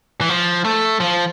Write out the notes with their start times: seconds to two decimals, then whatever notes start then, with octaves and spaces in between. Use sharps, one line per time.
0.21 E3
0.29 F3
0.65 A3
1.00 F3